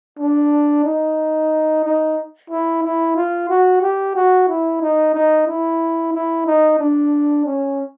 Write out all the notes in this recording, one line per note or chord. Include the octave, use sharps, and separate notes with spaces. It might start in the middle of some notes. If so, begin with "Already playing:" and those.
D4
D#4
D#4
E4
E4
F4
F#4
G4
F#4
E4
D#4
D#4
E4
E4
D#4
D4
C#4